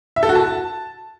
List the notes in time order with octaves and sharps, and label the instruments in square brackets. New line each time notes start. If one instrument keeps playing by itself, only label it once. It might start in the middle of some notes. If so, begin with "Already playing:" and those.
[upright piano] E5
A4
F#4
A5